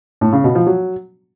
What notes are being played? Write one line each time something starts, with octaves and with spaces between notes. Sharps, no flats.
A2
C#3
B2
F3
F#3